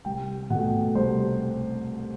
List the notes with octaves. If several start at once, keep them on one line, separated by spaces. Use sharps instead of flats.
C2 G5
B2 A3 F#5
C2 C5